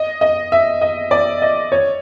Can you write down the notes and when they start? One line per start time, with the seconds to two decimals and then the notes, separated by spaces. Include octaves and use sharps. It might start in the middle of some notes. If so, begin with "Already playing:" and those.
Already playing: D#5
0.21 D#5
0.52 E5
0.81 D#5
1.11 D5
1.42 D#5
1.72 C#5